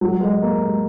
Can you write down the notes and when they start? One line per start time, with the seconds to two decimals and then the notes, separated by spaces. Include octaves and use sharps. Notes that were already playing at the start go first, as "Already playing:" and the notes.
0.01 F#3
0.21 G#3
0.42 A#3
0.63 G#3